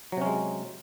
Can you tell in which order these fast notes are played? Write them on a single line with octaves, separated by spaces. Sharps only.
F#3 C3 C#4 G#3